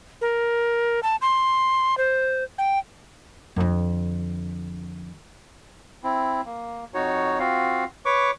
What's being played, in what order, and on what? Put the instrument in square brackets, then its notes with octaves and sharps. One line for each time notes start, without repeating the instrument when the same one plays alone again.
[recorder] A#4
A5
C6
C5
G5
[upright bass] F2 D3
[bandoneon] C4 E4
A#3
F2 D#4 F#4 C#5
C4 F4 F#4 F5
B4 C#5 C#6 D6